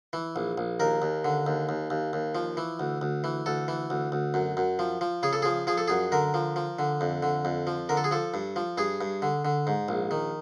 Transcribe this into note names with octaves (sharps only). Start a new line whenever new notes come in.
E3
A#1
A#1
D#2 A#4
D#2
D3
D#2
D#2
D#2
D#2
F3
E3
D2
D2
E3
D2 A4
E3
D2
D2
F#2
F#2
F3
F3
C#3 G#4
A4
F3 G#4
F3 G#4
A4
F#2 G#4
D3 A#4
F3
F3
D3
F2
D3
F2
F3
D3 A#4
A4
G#4
F3 A4
G2
F3
G2 G#4
G2
D3
D3
G#2
A#1
D#3